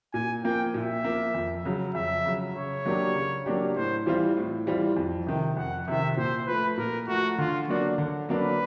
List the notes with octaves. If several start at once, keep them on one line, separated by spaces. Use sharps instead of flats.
A#2 G#5
F3 A#3 G5
A#2 E5
F3 A#3
F2
C#3 F#3
F2 E5
C#3 F#3
C#3 C#5
F#3 A#3 D4 G4
C#3
F#3 A#3 D4 G4
A2 C5
E3 G3 C4 F4
A2
E3 G3 C4 F4
F2
C3 D#3
F2 F#5
C3 D#3 E5
A#2 C5
F3 A3 B4
A#2 A#4
F3 A3 F#4
D3 F4
F#3 A#3 D4 F#4
D3
F#3 A#3 D4 B4